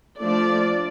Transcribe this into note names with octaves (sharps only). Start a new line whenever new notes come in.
F3 A3 D4 D5